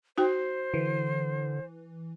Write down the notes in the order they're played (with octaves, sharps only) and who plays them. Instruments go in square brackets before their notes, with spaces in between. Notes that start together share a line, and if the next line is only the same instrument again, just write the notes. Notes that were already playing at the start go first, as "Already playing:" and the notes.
[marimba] D#4 F#4 G5 [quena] C5
[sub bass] D3 [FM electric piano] E3